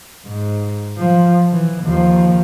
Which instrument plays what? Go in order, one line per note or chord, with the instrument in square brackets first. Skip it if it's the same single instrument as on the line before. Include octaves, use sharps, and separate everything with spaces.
[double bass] G#2
F3
E3
D#2 F3